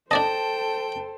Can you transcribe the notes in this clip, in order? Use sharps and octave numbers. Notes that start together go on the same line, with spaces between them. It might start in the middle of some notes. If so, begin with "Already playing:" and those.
D4 A4 C5 D5 D#5 G5 A5